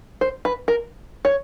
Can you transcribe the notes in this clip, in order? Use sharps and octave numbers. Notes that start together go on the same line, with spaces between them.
C5
B4
A#4
C#5